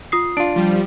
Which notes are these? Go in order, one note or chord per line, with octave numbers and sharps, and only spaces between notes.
F4 D#6 C7
D4 F4 D7
F3 G3